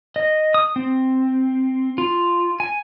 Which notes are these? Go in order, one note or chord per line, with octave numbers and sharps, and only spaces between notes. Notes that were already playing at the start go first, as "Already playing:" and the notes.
D#5
D#6
C4
F4
G#5